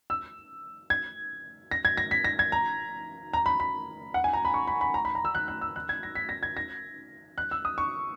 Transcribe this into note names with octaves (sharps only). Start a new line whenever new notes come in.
E6
G#6
A#6
G#6
A#6
B6
A#6
G#6
A#5
A#5
B5
B5
F#5
G#5
A#5
B5
C#6
B5
B5
A#5
B5
A#5
E6
F#6
F#6
E6
F#6
G#6
A#6
B6
A#6
G#6
A#6
F#6
E6
D#6
C#6